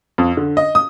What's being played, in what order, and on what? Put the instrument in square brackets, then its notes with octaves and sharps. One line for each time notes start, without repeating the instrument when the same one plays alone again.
[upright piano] F2
D3
D#5
D#6